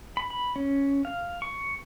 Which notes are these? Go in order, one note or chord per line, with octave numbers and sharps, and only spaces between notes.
B5
B5
C#4
F5
C#6